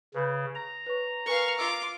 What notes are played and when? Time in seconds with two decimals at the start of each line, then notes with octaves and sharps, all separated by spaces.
0.14 C#3 B4 B5 G6
0.55 A#5
0.86 B4 C#5 C#6
1.26 A#4 B4 F5 G#5 C#6
1.59 F4 D6 E6